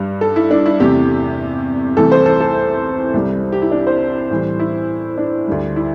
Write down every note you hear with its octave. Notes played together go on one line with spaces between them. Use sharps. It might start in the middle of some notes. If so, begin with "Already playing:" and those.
Already playing: G2 G3
A4
E4
D4
E4
E2 C3 A3 G4
C2 C3 E3 A3 A4
C5
A4
A4
C2 C3 G3
G4
E4
D4
C5
A2 E3 G3
E4
D4
D2 D3 G3
E4